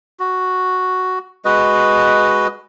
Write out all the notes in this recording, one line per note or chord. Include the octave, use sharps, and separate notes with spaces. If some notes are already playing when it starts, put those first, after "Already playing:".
F#4
G#3 F#4 B4 D#5